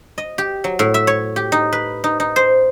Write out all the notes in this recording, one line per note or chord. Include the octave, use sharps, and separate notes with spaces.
D#5
G4
F#3
A2
E5
C#5
G4
D#4
B4
D#4
D#4
C5